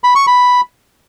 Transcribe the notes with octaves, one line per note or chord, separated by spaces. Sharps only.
B5
C#6
B5